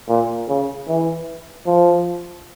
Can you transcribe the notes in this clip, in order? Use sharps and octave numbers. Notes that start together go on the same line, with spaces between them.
A#2
C#3
E3
F3